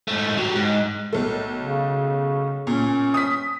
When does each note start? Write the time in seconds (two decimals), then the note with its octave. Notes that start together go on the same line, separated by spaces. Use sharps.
0.08 G#2 A3
0.37 F#3 G4
0.56 G#2
1.12 B1 A3
1.61 C#3
2.67 A#2 C#4
3.14 D#6 B6